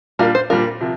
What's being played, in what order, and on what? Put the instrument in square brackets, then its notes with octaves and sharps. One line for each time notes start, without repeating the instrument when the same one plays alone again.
[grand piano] A#2 G3 D4 F4 [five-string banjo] A#4
[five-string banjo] C5
[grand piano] A#2 G3 D4 F4 [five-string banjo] A#4
[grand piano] C3 F3